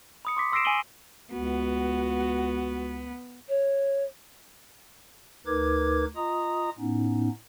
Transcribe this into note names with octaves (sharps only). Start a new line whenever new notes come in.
B5 D#6 C#7
C6 D6 B6
C6 E6 A#6 C7 D7 E7
G#5 C7 D7 D#7 F#7 G7
C#2 B3 F#4
C#5
D2 D#4 A#4 B4 D6 G#6
F4 D#5 A#5 D#6
A2 B3 C#4 D#4